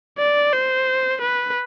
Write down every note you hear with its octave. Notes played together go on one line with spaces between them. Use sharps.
D5
C5
B4